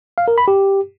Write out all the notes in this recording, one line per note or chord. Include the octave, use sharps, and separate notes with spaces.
F5
A#4
B5
G4